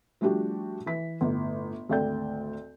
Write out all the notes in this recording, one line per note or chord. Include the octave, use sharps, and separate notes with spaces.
F3 G3 A3 D4 F#4 G4
E3 B6
G1 A2
G#1 D2 A4 D5 G5 G6